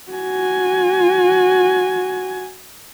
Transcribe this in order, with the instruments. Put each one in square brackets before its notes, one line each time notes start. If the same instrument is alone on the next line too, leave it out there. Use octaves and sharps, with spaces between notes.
[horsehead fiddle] F#4 G#5